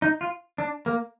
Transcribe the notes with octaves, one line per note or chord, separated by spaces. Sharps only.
D#4
F4
D4
A#3